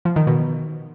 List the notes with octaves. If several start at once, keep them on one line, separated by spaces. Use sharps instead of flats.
F3
D#3
B2